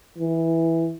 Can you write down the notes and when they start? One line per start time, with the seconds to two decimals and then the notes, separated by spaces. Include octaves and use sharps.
0.18 E3